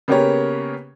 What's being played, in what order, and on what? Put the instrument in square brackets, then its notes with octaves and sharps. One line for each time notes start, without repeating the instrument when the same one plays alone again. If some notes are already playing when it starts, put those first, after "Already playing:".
[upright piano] C#3 A#3 B3 G4 A#4 C#5